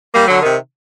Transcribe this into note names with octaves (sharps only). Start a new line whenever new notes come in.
G3 A#3
D3 F#3
C3 D#3